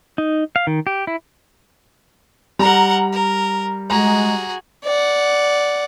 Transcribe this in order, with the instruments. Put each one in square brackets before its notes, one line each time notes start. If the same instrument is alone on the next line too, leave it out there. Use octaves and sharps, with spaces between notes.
[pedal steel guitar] D#4
F5
D#3
G4
E4
[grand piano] G3 [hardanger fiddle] A#4 F#5 [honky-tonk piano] A#5
[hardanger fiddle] A#4
[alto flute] G#3 [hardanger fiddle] F#4 G#4 [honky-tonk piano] A#5
[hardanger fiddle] D5 F#5